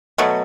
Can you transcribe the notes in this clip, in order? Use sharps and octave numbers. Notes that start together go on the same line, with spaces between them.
B2 F#3 A3